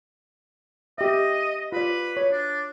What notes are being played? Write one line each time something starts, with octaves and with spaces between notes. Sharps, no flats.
G4 D#5 E5
F4 B4 D5
C#5
D4